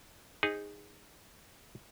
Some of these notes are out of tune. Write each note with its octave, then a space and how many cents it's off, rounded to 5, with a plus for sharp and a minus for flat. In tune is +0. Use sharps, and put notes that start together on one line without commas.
D#4 +0 G#4 -20 C5 +0